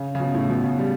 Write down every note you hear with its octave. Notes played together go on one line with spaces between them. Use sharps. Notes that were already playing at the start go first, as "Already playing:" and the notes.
Already playing: C#3
C#3
B2
A2
B2
C#3
G3